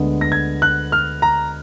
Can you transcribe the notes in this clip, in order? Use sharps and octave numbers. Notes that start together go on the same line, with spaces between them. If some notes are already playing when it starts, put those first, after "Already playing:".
Already playing: D2 D3 G#3 B3
A#6
G#6
F#6
F6
A#5